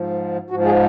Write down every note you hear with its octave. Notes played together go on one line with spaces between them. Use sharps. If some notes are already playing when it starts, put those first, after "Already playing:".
Already playing: G#2 F3
G#2 F3 F#4
G#4